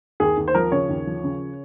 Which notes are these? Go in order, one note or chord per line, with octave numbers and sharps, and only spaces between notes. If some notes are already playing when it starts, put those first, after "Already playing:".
D#2 G#4
D#2
C5
F3 A#4
C#3 C#5
D#2
F3
C#3